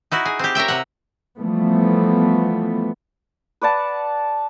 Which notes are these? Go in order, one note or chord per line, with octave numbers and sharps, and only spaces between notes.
D#4 E4 F#4
G#4
C4 G4
A#4 C#5 E5 G5
C3 F#5
E3 F3 G3 A3 B3
B4 D5 F#5 A5